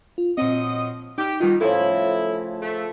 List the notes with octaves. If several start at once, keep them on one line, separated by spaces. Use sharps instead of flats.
F4
A#2 F3 F#3 C4 D#5
D#4 G4
B2 D#3 G3 F4
A2 C#3 F3 E4 A4 C5
A3